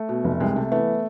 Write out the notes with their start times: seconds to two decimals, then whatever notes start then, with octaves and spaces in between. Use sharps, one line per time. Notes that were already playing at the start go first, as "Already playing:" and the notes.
Already playing: A3
0.09 B2
0.24 F1
0.40 C2 G#3
0.56 C3 A3
0.72 E3 A3 B3